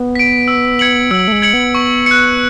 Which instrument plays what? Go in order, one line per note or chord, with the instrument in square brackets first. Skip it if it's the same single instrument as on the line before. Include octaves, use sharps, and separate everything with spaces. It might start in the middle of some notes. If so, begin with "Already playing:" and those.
Already playing: [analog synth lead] B3
[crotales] B6 D7
E6
G#6 C#7 F#7
[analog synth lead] F#3 [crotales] E6
[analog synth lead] A3
G#3
[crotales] G#6 C#7 F#7
[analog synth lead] B3
[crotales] C#6
F#6 C#7